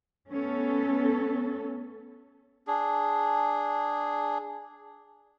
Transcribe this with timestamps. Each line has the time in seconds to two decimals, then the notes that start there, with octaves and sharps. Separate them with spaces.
0.29 A3 B3 C#4 A4
2.67 D4 G#4